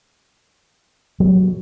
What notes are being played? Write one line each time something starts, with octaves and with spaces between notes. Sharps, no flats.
F#3